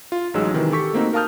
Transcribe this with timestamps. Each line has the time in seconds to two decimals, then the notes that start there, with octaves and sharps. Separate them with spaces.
0.12 F4
0.34 A1 F#3 G#3 D#4 E6
0.54 C3 D#3 E3
0.72 G4 A4 C#6 B6
0.93 A3 A#3 C4 D#4 F#4
1.13 A#4 F5 A5 D#6 F6 G6